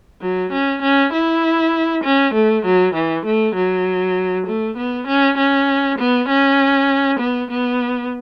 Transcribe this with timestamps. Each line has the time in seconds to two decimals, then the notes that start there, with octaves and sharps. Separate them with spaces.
0.22 F#3
0.52 C#4
0.82 C#4
1.13 E4
2.04 C#4
2.34 A3
2.65 F#3
2.95 E3
3.26 A3
3.56 F#3
4.47 A3
4.77 B3
5.08 C#4
5.38 C#4
5.99 B3
6.29 C#4
7.20 B3
7.51 B3